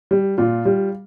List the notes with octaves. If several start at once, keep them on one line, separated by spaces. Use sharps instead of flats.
G3
A#2 F4
G3